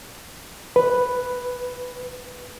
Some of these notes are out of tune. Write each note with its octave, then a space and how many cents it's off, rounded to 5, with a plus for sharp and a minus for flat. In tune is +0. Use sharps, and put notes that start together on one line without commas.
B4 +0